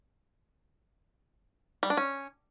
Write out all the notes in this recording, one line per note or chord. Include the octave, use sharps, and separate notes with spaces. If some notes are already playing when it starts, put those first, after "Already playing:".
G3
D4
C#4